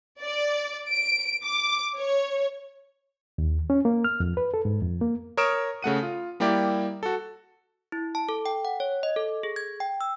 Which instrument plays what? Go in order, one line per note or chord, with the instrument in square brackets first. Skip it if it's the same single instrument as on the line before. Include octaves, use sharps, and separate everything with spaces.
[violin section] D5
D7
D6
C#5
[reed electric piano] D#2
C#4
A#3
F6
F2
B4
A4
G#2
F2
A#3
[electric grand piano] A#4 C#5 D#6 F6 D7 E7
C#3 A3 F#5 D#7
F4
G3 A#3 E4 G4 D5
F#4 A4
[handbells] E4
A5
A4
G5
F#5
C#5
D#5
A4
G#4
G#6
G5
E6